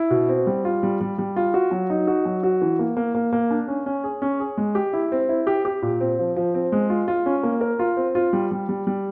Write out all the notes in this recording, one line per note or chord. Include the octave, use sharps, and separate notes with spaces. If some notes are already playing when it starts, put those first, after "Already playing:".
Already playing: E4
B2
C4
G3
F4
G3
G3
G3
F4
F#4
F#3
D#4
F#4
F#3
F#4
E3
A#3
A#3
A#3
A#3
D4
C#4
C#4
G#4
C#4
G#4
G#3
G4
E4
C4
E4
G4
G4
A#2
C4
F3
F3
C4
G#3
F4
F4
C#4
A#3
A#4
F4
C4
F4
G3
G3
G3
G3